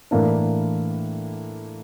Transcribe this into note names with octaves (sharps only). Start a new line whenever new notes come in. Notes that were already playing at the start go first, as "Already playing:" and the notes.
A2 E3 A#3 D4